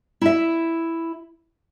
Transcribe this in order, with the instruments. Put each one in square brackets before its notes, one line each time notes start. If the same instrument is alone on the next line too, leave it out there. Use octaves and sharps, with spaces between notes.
[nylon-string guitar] E4 E5